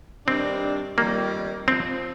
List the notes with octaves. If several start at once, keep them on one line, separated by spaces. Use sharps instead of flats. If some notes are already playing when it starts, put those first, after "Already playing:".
G2 D#3 G3 C4 D4
F2 D#3 G3 A#3
F3 C4